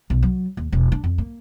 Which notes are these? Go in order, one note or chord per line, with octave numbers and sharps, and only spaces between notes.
B1
F#3
D#2
E1
D4
F2
A#3